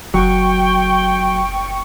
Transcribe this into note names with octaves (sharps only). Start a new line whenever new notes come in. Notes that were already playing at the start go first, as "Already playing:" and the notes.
F#1 F#3 G5 C#6